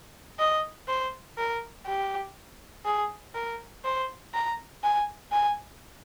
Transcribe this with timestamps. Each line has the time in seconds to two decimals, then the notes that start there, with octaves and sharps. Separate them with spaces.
0.39 D#5
0.88 C5
1.38 A#4
1.87 G4
2.85 G#4
3.35 A#4
3.84 C5
4.34 A#5
4.83 G#5
5.32 G#5